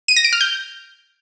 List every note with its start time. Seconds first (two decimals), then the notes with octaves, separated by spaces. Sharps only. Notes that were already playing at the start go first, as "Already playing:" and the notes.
0.08 D#7
0.16 A#6
0.25 D7
0.33 F6
0.41 G6